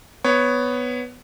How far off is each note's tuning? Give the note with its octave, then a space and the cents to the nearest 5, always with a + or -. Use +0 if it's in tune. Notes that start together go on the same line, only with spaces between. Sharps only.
B3 +5 C#5 +0